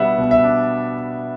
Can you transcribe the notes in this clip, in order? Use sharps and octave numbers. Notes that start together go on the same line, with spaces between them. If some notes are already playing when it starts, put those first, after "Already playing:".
Already playing: B2 G3 B3 D4 E5 F#5
B2
E5
D4